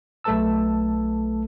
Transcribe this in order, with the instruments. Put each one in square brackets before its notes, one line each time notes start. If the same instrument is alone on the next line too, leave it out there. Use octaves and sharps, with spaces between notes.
[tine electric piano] B1 A3 A4 B4 A5 E6